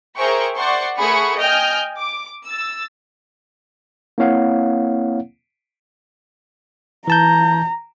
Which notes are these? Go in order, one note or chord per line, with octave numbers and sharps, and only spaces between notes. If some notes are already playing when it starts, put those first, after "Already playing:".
G#4 A#4 C5 E5 G5 C#6
C5 D5 F#5 C6 C#6
A3 G#4 A#4 F#5 B5 C#6
D#5 G5 G#5 F6 G6
D6
E6 A6
A#3 C4 E4 C#5 F5 F#5
E3 A5 A#5 G6